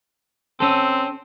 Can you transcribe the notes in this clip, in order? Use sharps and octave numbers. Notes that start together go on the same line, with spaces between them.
C4 C#4 A4